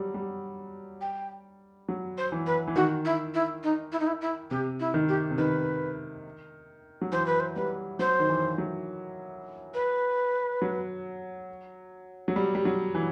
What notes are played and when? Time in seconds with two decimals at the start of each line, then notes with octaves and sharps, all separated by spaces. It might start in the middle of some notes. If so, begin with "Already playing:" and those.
Already playing: F#3 G3
0.14 G3
1.01 G5
1.89 F#3
2.18 C5
2.32 E3
2.46 B4
2.68 E3
2.76 D#3 F#4
3.05 E4
3.34 E4
3.63 D#4
3.92 E4
4.00 D#4
4.07 E4
4.21 E4
4.51 C3 G4
4.80 E4
4.94 D#3
5.09 G4
5.31 C3
5.38 D#3 B4
7.01 F#3
7.12 E3 C5
7.26 B4
7.40 C5
7.56 G3 B4
7.99 F#3 C5
8.20 D#3
8.29 E3
8.58 F#3
9.74 B4
10.62 F#3
12.28 F#3
12.36 G3
12.55 G3
12.65 F#3
12.95 E3